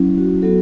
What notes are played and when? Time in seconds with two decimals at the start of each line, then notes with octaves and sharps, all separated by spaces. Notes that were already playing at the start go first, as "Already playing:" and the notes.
Already playing: F#3 C#4 E4
0.18 F#4
0.42 F#3 B3 F#4 A4